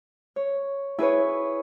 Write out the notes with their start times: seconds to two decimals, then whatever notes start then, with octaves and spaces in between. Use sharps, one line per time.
0.36 C#5
0.99 E4 G#4 B4 C#5